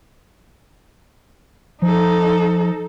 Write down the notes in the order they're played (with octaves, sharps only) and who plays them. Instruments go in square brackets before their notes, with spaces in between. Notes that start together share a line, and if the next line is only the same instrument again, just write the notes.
[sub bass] F3 [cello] D#4 A4